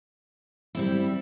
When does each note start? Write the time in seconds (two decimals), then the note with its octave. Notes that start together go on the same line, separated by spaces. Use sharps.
0.75 G3 C4 E4